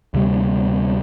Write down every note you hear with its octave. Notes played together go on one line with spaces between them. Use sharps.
D2 C3 G3 A#3